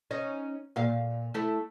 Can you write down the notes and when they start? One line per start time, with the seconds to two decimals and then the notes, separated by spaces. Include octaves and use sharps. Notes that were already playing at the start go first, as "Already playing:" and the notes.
0.11 C#4 D#4
0.76 A#2 F5
1.34 A3 E4